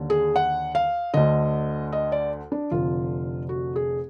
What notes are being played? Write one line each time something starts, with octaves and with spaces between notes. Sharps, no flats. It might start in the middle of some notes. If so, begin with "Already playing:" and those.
Already playing: D#2 D3
G#4
F#5
F5
D2 D3 D#5
D#5
D5
D4
F1 F2 D3 F4
F#4
G#4